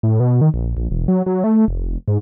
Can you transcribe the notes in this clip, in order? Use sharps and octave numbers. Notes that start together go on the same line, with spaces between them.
A2
B2
D#3
A#1
A#1
E1
F#3
F#3
A3
F1
G#2